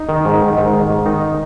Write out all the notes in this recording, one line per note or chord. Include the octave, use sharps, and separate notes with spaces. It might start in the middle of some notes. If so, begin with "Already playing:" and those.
Already playing: D#4
D#3
G#2
D#3
G#2
D#3
G#2
D#3 D#4